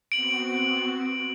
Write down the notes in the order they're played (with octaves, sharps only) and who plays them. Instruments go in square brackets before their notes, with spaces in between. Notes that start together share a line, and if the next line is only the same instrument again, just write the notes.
[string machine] B3 C4 F#4 [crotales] D7 F#7